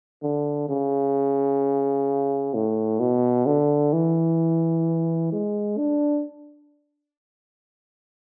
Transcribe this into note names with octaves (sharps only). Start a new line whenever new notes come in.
D3
C#3
A2
B2
D3
E3
G#3
D4